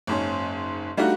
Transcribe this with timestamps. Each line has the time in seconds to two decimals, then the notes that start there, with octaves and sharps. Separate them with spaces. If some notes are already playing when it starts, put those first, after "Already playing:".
0.07 F#1 G#2 C#4
0.97 G3 A3 D4 D#4 F4 F#4